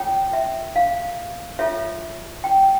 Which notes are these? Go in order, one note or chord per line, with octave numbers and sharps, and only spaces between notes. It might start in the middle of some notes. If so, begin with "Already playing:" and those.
Already playing: F4 A4 C#5 G5
E5
F5
F4 A4 C#5 E5
G5